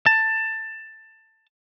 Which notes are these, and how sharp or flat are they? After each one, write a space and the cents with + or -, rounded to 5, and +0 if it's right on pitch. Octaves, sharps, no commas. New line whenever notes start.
A5 +15